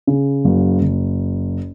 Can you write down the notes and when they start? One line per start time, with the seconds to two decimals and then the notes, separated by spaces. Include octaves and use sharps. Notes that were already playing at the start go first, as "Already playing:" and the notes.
0.07 C#3
0.45 F#1
0.82 F#1